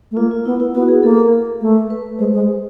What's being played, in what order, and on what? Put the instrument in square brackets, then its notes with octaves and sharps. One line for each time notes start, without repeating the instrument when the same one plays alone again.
[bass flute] A3
[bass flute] A#3 [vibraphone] F4
[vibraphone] F4
[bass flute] B3 [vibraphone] E4
[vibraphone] E4
[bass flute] B3 [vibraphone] F#4
[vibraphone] G#4
[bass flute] A#3 [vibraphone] A4
[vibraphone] A#4
[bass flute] A3
[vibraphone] B4
[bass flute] G#3 [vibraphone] C5
[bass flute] G#3